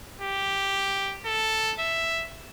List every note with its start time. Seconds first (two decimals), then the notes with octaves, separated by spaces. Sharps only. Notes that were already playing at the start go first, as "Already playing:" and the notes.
0.21 G4
1.26 A4
1.79 E5